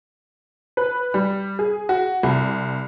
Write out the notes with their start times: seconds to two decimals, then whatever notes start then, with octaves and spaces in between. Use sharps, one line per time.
0.77 B4
1.14 G3
1.59 G#4
1.89 F#4
2.23 C2